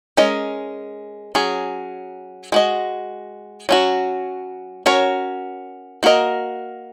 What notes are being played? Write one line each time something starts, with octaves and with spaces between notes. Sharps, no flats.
G#3 C#4 A#4 D#5
F#3 C#4 G#4
G#3 F#4 D#5
F#3 C#4 F#4
C#4 F#4 A#4 C#5
A#3 F#4 A#4 D#5